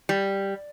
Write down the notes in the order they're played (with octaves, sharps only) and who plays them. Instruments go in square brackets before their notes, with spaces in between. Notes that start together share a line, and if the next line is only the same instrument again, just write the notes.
[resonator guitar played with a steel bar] G3